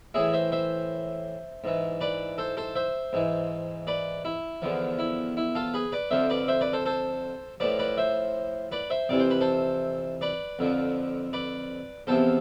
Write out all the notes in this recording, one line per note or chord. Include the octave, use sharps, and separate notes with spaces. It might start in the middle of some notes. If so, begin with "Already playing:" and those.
A2 E3 E4 G#4
C5 E5
C5 E5
G#2 E3
B4 D5
A4 C5
A4 C5
C5 E5
G#2 E3
B4 D5
E4
E2 D3 F3
E4
E4
F4 A4
G#4 B4
B4 D5
F2 D3 F3 C5 E5
B4 D5
C5 E5
B4 D5
A4 C5
A4 C5
A2 F3 B4 D5
B4 D5
C5 E5
B4 D5
C5 E5
F2 C3 E3 D5
C5
B4
A4 C5
B4 D5
F2 D3 F3
B4 D5
E2 C3 F3 A4 C5